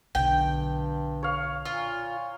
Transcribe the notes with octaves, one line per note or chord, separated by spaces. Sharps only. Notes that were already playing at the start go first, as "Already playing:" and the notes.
B1 G2 D3 G5
C#5 F5
A#2 F4